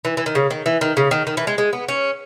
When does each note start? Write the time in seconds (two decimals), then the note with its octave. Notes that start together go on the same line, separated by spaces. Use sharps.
0.05 E3
0.17 E3
0.26 D#3
0.35 C#3
0.50 D#3
0.66 E3
0.81 D#3
0.97 C#3
1.11 D#3
1.27 D#3
1.37 E3
1.47 G#3
1.58 G#3
1.73 B3
1.88 C#4